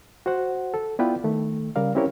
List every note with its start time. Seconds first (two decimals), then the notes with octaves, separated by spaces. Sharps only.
0.26 F#4 C5 F#5
0.74 A4
0.99 B3 E4 F4 B4 D5 G5
1.24 D#3 A3
1.76 C#3 G3 A#4 D5 F5
1.95 C4 C#4 E4 G4 A#4 C#5